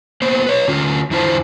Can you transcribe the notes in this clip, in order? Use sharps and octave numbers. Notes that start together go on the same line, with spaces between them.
A#3 B3 C5
B4 C#5
D3 C#4 F4
E2 D3 E4 F4 C5 A5